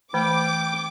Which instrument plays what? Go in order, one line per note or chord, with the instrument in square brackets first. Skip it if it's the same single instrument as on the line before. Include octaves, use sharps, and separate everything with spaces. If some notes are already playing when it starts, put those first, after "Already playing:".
[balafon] E3 A3 [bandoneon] G5 [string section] D6